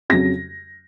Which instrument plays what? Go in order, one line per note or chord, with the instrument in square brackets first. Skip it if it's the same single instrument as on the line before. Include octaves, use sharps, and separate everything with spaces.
[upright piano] F2 C#3 F#3 A#6